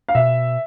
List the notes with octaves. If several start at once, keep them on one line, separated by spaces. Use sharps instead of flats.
F5
B2 E5